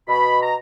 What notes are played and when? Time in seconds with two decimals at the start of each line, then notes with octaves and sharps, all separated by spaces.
0.08 B2 B5
0.43 A#5